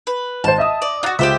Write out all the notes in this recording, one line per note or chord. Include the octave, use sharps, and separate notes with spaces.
B4
G#1 C5 A5
D#5 E5 D#6
D5
F4 F#4 D6 F#6 A6
C#2 F4 G4 C5 E5 D6